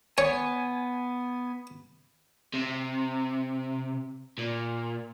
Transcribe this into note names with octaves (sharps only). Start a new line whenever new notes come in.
B3 C#5 G#5
C3
A#2